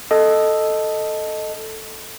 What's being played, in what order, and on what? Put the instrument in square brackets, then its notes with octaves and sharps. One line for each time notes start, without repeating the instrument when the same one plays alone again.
[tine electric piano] A4 D#5